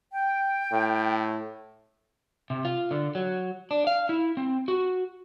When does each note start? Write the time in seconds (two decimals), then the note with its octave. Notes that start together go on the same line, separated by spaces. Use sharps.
0.13 G5
0.72 A2
2.50 C3
2.65 F4
2.91 D3
3.15 F#3
3.71 D4
3.87 F5
4.09 E4
4.37 C4
4.68 F#4